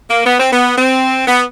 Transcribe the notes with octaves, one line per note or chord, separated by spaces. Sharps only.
A#3
B3
C4
B3
C4
B3